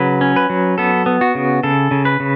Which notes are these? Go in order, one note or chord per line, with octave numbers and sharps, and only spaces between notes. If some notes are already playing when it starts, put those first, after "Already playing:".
Already playing: C#3 F#3 B4
C#4
B4
F#3
B3 A4
B3
F#4
C#3
C#3 A4
C#3
B4
C#3